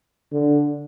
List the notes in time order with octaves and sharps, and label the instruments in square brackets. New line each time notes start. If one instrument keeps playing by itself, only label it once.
[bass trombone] D3